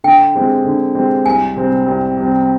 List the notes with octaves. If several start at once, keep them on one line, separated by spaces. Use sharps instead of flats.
D3 G5
G#3 C4 G4
D3
G#3 C4 G4
C2 G#5
C3 G3 C4
C2
C3 G3 C4